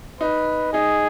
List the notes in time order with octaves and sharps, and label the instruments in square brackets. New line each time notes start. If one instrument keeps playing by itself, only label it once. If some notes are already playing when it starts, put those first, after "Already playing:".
[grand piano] D#4 [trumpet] B4
[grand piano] D#4 [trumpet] G#4